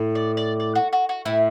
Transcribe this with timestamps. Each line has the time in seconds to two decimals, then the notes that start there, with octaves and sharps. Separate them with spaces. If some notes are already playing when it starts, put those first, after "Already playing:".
Already playing: A2
0.15 D5
0.37 D5
0.60 D5
0.75 F#4
0.93 F#4
1.09 F#4
1.25 A2 E4